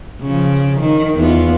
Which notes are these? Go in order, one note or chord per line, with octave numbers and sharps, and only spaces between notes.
C#3 F3
D#3
E2 B3 F4